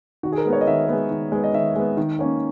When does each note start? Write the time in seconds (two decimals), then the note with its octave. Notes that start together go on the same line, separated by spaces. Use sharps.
0.23 D#3 F#4
0.32 G#4
0.38 A#4
0.45 G#3 B3
0.53 C#5
0.61 D#5
0.67 D#3 E5
0.88 G#3 B3
1.10 D#3
1.32 G#3 B3
1.44 D#5
1.53 D#3 E5
1.76 G#3 B3
1.97 D#3
2.19 A#3 C#4